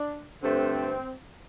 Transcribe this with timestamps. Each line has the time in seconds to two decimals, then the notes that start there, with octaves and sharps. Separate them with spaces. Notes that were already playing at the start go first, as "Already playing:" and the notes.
Already playing: D4
0.42 G2 D3 A3 C4